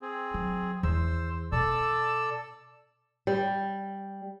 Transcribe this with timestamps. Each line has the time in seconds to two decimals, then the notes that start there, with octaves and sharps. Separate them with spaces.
0.02 C4 G#4
0.34 F#3
0.83 E2 C5 E6
1.52 B2 A4 D5 E6
3.27 G3